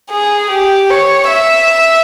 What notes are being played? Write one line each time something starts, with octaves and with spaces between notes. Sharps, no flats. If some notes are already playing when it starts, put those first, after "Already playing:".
G#4
G4
C#5
E5